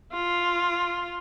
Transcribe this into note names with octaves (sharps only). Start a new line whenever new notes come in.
F4